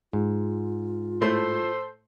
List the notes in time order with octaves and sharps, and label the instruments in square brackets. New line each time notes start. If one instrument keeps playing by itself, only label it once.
[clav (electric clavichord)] G#2 [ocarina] F4
[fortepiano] A2 A3 C6 [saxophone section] A4 C5